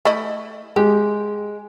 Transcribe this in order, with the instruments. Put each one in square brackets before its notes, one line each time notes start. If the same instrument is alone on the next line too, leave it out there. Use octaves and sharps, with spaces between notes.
[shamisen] A3 E4 D#5
[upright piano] G#3 [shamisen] G4